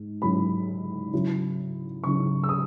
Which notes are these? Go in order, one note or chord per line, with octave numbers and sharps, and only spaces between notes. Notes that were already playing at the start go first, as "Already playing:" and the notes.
Already playing: G#2
G#2 F#3 C#4 E4 B5
C#3 F#3 C#4 E4
C#3 F#3 C#4 E4 C#6
E6
D#6